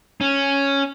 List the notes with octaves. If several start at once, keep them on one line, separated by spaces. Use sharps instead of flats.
C#4